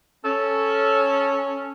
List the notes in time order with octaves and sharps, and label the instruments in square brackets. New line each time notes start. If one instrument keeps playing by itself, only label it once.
[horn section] C#4 [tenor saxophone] A4